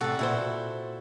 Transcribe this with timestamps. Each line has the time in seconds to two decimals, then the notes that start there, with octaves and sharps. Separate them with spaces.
0.01 A2 C3 F#4 A4
0.19 A#2 E4 F#4 C5